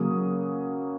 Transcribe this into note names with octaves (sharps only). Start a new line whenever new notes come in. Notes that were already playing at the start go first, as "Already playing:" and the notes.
Already playing: C#3 F#3 A#3 C#4 D#6